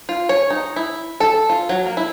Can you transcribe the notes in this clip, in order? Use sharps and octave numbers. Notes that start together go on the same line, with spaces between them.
F4
C#5
D#4
E4
A4
F4
F#3
A#3
E4